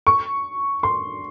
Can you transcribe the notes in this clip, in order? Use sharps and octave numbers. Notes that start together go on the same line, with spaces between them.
C#6
C6